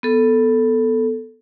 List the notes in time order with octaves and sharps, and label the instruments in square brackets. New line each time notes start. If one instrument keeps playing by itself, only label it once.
[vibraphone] B3 A4